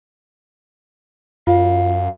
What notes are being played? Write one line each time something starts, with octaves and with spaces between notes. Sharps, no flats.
F#2 F4 F5